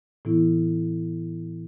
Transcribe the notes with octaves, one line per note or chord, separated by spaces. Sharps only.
A2 E3 B3 E4